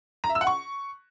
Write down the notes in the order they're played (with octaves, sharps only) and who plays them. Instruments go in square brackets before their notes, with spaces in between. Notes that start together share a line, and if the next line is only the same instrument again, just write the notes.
[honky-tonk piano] A#5
E5
E6
F#5
C#6